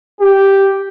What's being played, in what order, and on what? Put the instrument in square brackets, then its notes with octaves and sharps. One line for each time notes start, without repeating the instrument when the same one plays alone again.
[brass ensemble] G4